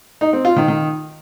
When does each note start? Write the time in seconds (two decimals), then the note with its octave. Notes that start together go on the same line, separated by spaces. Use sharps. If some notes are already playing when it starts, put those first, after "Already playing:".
0.21 D#4
0.33 C4
0.45 F4
0.56 D#3
0.68 D#3